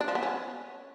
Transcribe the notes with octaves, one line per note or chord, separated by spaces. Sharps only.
D4
F3
B3
C#4